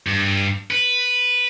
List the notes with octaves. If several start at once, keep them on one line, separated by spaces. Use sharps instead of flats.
G2
B4